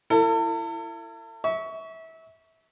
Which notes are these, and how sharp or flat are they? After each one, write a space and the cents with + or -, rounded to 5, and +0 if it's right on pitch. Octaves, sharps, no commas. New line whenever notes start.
E4 +25 A4 +45
E5 -25 C#6 +20